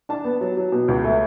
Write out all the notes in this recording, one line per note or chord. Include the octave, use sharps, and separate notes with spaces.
D4 A5
B3
F#3
F#3
B2
C#2
A3